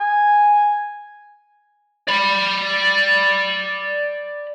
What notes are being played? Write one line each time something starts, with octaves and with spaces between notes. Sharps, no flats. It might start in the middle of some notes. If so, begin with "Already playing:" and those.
G#5
D5 B5